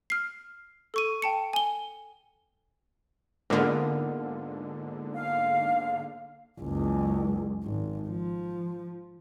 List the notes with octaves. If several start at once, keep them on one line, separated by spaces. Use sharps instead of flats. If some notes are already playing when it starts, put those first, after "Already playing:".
F6 C7
A4 C#6 D#7
G5 A5 C#7
G#5 G7
G#2 D3 A#3 B3 F4
F5
F#1 C#2
G#1
F3